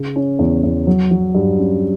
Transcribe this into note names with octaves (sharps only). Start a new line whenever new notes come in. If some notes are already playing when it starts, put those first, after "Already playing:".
Already playing: C#3
C#4
E2
E2
F#3
F#3
G2
C#4